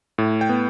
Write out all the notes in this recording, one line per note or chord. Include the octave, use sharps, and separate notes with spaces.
A2
G5
B3